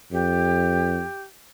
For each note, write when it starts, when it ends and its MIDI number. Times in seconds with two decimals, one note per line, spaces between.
0.12 1.04 41
0.12 1.21 67